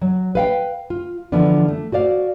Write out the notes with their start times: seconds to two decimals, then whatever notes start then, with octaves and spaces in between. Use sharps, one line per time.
0.02 F#3
0.35 B4 F5 G5
0.90 F4
1.32 D3 E3 F3 B3 D4
1.68 A3
1.92 F#4 C5 D5 F5